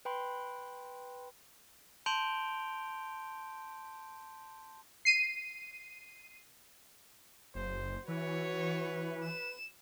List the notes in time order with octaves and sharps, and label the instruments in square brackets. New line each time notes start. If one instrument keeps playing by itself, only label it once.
[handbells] B4 G5 B5 C6
[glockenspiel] A5 C6 G6 D7 F7 G7
[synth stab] C7 D#7
[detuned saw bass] F#1 [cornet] C5
[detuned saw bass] E3 [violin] F#4 C#5 [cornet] B4
[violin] E7